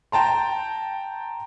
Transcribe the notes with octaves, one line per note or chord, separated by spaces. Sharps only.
G5 A5 A#5 C6